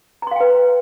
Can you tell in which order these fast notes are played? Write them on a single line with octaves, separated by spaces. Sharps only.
A#5 C6 F5 G5 B4